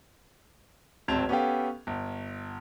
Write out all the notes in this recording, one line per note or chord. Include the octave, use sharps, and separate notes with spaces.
D1 G#1 C4 A5 G#6 F7
B3 C#4 G4 A4 F5 G5
G1